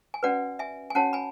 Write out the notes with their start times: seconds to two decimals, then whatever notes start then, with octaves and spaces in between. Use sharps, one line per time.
0.14 G#5
0.23 C#4 F#4 B4 D5 F#5
0.59 E5 G#5
0.90 G#5
0.95 C#4 F#4 C#5 F#5 A5
1.13 G#5 B5